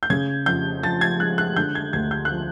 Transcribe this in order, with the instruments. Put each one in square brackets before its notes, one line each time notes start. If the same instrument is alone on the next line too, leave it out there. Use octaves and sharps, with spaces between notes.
[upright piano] G6
C#3 G#6
F2 G6
F3 A6
G#6
G#3 F#6
F#6
D3 G6
G#6
D2 G#6
G6
F3 F#6